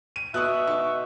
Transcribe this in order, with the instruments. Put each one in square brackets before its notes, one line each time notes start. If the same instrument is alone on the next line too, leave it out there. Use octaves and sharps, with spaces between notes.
[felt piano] D#7
[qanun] B2 [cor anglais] E5 [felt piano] C#6 D#6 F#6
[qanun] D#4 D6 [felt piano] C#6